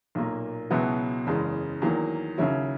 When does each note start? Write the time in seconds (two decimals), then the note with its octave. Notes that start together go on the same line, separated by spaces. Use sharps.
0.15 B1 A#2 A#3
0.70 C#2 B2 F#3 B3 E4
1.26 F#1 E2 C#3 G#3
1.82 E2 D#3 F#3 A#3
2.38 D#2 C#3 F#3 C#4 E4